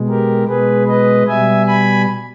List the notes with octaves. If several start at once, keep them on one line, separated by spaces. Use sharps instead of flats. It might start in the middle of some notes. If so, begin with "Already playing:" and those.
Already playing: B2 G#3
G4 A#4
B2 G#3 G#4 B4
B4 D#5
B2 G3 E5 G#5
G#5 B5